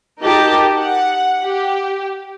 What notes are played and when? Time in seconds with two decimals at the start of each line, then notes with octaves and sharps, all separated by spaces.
0.21 D#4 G4 A#4 D#5 A5
0.78 F#5
1.43 G4